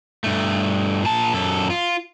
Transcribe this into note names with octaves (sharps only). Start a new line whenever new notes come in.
G2 A3
A#2 A5
F#2 A4
F4